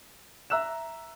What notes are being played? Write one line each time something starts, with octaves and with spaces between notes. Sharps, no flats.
E5 A#5 E6 F#6 E7